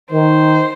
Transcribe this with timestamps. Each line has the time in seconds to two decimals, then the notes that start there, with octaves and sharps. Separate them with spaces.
0.12 D#3 C5